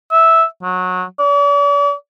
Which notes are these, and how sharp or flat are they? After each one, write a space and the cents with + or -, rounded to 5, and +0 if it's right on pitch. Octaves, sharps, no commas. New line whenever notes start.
E5 -10
F#3 -20
D5 -45